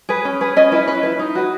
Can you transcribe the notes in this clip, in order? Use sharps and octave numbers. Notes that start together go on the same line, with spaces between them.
G#4 B4
C#4
G#4 B4
C#4 D#5
E4 B4
C#4 B4
E4 B4
D#4
F#4 B4